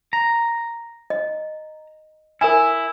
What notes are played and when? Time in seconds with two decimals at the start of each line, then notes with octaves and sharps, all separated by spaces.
0.13 A#5
1.10 D#5
2.41 E4 A#4 E5 G#5